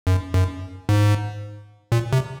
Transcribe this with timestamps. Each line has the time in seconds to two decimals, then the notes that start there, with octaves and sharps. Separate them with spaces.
0.07 F#2
0.34 F#2
0.89 G#2
1.92 A#2
2.13 C3